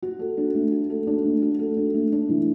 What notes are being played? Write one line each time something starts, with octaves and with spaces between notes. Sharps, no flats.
F#4
A4
D4
A3
F#4
A4
D4
A3
F#4
A4
D4
A3
D4
E3